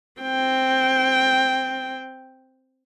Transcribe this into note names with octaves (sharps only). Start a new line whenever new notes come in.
C4 G5